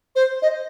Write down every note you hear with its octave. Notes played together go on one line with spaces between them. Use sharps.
C5
D#5